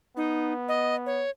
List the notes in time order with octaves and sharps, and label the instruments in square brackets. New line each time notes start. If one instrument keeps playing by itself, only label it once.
[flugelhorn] B3 [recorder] D#4
[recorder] D#5
C#5